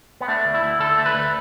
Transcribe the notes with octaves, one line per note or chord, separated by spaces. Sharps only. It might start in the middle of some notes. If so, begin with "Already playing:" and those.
B3
A3 D4
D2
E4
D2
D3 A4
A3
B4
D2